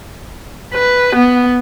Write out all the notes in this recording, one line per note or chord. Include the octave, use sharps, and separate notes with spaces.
B4
B3